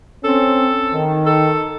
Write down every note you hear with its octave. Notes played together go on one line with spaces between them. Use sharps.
C4 C#4 A4
D#3
A4